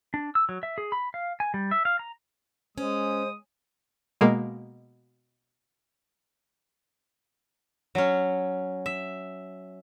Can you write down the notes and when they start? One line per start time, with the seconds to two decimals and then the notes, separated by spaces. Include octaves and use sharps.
0.14 D4
0.35 E6
0.49 F#3
0.63 E5
0.78 G#4
0.92 B5
1.14 F5
1.40 G#5
1.54 G3
1.71 E5
1.85 F5
1.99 A#5
2.78 G#3 C#4 C5 D#6
4.21 B2 G#3 A#3
7.95 F#3 C#4
8.86 E5